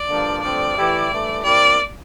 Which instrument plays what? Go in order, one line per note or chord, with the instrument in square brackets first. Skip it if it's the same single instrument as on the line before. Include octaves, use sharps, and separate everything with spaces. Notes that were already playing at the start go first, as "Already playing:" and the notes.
Already playing: [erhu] D5
[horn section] G2 D3 F3 A#3 D4
[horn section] G2 D3 F3 A3 C4 [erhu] D5
[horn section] E3 A3 E4 G4
G2 E3 A3
[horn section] C3 G3 A#3 E4 G4 [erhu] D5